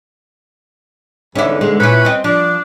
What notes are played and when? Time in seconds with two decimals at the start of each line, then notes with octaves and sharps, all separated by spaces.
1.35 E2 G#2 D3 C#4 E4
1.61 G#3
1.80 A#2 C#4 E4 B4
2.05 C4 D#5
2.24 F3 D4